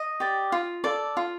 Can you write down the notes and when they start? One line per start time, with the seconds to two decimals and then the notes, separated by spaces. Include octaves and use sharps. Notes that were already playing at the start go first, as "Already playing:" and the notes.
Already playing: D#5
0.20 G4 D5
0.52 F4
0.84 A4 D5
1.17 F4